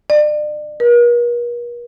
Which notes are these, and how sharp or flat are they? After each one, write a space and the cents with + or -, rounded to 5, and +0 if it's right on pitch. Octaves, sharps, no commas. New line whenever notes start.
D5 +35
A#4 +45